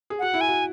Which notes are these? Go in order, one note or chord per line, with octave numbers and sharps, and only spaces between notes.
G#4
F#4 F#5
E4
G#5
F#4